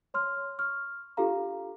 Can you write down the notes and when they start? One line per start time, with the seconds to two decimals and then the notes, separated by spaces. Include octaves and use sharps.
0.14 C#5 C6 F6
0.59 C#6 F6
1.17 D4 F4 G4 A4 F5 A#5